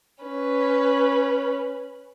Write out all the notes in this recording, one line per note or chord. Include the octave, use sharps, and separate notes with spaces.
C#4 B4